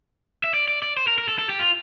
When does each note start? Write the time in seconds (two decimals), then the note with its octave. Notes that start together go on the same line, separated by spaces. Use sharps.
0.44 E5
0.54 D5
0.68 D5
0.82 D5
0.97 C5
1.08 A#4
1.18 A#4
1.29 A4
1.39 A4
1.49 G4
1.60 F4